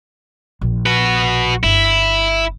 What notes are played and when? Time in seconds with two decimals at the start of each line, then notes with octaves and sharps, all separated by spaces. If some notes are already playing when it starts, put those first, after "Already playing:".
0.61 A#1
0.86 F#4 B4
1.63 G1 E4